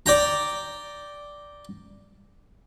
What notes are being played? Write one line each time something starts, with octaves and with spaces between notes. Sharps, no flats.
D5 G5 A#5